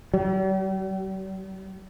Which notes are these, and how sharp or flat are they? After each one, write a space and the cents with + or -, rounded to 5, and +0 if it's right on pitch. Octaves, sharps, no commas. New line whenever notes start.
G3 -45